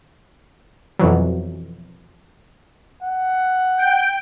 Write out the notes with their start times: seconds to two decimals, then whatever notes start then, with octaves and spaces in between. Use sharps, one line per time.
0.99 F2 B2 E3 F#3
3.03 F#5
3.78 G5